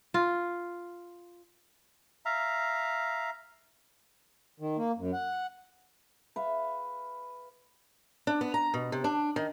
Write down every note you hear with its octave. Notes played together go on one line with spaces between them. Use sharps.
F4
E5 F5 A#5
D#3
A#3
F#2
F#5
B4 E5 F5
D4
B3
A#5
B2
C3
D4
D#3